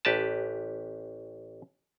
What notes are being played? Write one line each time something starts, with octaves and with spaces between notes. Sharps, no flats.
A1 G4 B4 A5